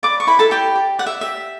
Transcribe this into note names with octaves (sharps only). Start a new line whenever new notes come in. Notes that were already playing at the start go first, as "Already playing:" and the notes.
B4 D5 D6
C#6
E4 B4 B5
A4 A5
G4 D5 G5
G4
D5 F#5
E5
G4 E5